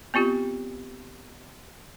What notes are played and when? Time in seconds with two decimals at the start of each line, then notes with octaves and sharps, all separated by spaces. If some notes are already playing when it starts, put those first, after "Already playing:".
0.14 B3 C4 F4 G4